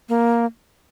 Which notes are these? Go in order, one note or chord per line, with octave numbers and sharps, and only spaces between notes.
A#3